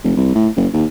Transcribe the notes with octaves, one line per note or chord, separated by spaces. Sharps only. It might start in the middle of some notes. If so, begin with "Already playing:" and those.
F1
C2
A2
F#1
D#2